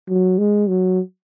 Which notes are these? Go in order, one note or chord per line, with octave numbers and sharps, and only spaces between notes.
F#3
G#3
F#3